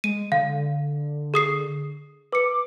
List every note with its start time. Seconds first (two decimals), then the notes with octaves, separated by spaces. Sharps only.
0.04 G#3 D#7
0.32 D3 F5
1.34 G#4 D#6 C7
2.32 B4 D6 C#7